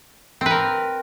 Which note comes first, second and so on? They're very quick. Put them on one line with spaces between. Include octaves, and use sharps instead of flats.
C4 B4 A#4